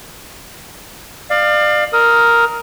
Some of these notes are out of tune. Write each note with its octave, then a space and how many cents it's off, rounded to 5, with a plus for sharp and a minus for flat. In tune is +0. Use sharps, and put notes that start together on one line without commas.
D5 +35 F5 +5
A#4 +0 D#6 +20